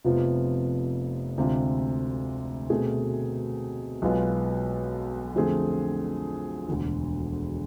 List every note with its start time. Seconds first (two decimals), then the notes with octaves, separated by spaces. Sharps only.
0.05 F1 F2 C3 F3 B3
1.38 D2 C3 G#3 D4 F4
2.70 B2 A3 C4 G#4
4.02 B1 B2 G#3 B3 F4
5.35 F2 D3 A3 C4 G#4
6.68 E1 D2 D3